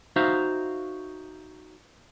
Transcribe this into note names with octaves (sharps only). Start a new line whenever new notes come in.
D#4 F#4 C5 E5 F5